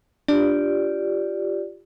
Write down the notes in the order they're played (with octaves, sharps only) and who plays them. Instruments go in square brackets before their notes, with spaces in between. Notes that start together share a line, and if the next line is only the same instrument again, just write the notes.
[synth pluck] D4 [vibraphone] F4 G4 D5